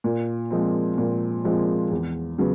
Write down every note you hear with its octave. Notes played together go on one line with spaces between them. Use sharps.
A#2
F3 G#3 C4
A#2
F3 G#3 C4
E2
C#3 F#3 B3